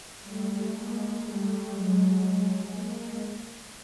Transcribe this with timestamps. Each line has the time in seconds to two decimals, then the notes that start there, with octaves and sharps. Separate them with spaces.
0.22 G3 A3
0.72 G#3 A#3
1.22 G3 A3
1.72 F#3 G#3
2.72 G#3 A#3